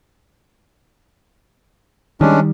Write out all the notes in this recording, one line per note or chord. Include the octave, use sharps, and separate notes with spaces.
D#3 G3 G#3 C#4 D4